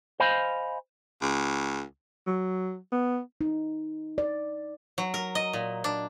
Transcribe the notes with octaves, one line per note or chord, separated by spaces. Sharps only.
C5 D#5 F5 G#5 B5
C#2
F#3
B3
D#4
D5
F#3
A#4
D#5
A#2
D4